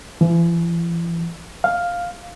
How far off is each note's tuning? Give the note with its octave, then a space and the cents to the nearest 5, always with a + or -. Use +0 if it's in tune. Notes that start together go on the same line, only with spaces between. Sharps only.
E3 +45
F5 +5